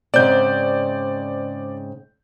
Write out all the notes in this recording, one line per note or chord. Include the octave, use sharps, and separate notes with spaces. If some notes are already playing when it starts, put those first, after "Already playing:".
G#2 C#3 C4 D5 G6